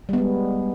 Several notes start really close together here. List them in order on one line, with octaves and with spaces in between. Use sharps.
G3 B3 G#3